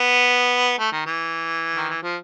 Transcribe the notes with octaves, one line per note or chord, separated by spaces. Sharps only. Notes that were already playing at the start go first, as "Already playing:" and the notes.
Already playing: B3
A3
D#3
E3
D#3
E3
F3